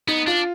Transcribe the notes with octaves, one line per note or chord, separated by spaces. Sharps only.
B3 D#4
D4 F4